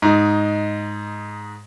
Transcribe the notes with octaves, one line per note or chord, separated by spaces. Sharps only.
G#2 D#4